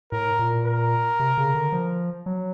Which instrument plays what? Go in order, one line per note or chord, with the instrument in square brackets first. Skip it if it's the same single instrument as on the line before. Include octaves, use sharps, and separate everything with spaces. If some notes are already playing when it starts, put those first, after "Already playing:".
[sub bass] A2 [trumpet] A#4
[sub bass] A#2
[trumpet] A#4
[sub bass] C3
C#3
D3
F3
F#3